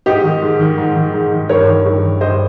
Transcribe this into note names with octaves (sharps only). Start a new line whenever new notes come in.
G#2 D#4 G4
D#3
G#2
D#3
G#2
D#3
G#2
D#3
G2 A#4 C#5
D#3
G2
D#3
G2 C5 D#5